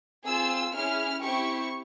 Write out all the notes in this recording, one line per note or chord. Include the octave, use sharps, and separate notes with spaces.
C4 F4 G#4 E6
C#4 E4 G#4 F6
C4 E4 G4 C#6